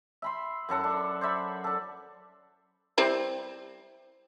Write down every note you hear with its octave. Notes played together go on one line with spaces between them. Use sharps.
E5 B5 C6
F#2 F#3 A4 F#5
D4
C5 D5 E5 B5
D4 A4
G3 C4 E4